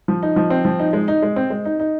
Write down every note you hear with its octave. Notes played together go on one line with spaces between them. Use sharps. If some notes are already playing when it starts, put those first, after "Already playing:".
F3
D#4
F3
C4
F3
D#4
G#3
D#4
G#3
C4
G#3
D#4
D#4